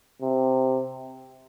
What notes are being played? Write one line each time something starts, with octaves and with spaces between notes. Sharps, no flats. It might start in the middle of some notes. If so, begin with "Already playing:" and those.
C3